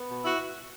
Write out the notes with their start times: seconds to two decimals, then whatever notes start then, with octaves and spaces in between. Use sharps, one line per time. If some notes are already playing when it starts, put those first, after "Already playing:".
Already playing: B3
0.11 B2
0.25 E4 F#4